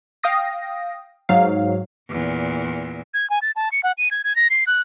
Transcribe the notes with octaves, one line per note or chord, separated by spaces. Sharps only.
F5 G5 D#6 A#6
G#2 F#3 F5
E2 A#2
G#6
G#5
A6
A5
C#7
F#5
D#7
G#6
G#6
A#6
C7
F#6